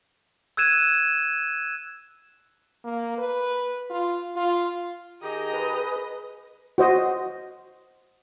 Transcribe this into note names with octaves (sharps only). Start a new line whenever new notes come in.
E6 F#6 G#6 D#7 E7
A#3
B4
F4
F4
D#3 G4 G#4 D#5 A#5
B4
F#4 C5 D#5